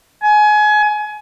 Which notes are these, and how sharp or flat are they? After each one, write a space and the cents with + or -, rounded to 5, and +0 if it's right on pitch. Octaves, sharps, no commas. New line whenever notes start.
G#5 +25